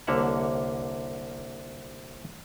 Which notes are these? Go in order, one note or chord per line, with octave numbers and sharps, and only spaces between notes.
C2 D3 A#3 C#5 E5 F#5